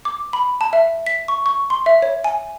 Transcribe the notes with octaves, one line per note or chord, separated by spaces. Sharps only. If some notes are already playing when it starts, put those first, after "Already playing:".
D6
B5
A5
E5
B6
C#6
C#6
C6
E5
C#5
G#5